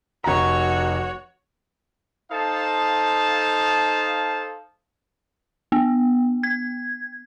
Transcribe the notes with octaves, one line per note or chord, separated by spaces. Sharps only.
F1 F#4 C#5 A#5
D#4 A4 C5 F5 A5 D#6
B3
G#6